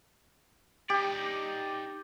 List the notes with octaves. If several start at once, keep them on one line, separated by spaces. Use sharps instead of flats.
D#4 G4 D5